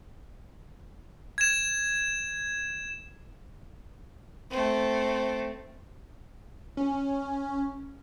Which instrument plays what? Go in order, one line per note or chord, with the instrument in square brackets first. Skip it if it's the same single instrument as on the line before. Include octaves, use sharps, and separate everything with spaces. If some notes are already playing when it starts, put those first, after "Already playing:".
[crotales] G#6 E7
[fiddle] A3 C4
[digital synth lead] C#4